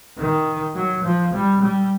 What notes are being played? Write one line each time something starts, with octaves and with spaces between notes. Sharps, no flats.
D#3
F#3
F3
G3
G3